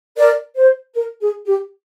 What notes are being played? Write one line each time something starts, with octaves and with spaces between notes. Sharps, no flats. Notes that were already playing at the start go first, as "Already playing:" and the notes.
A#4 D5
C5
A#4
G#4
G4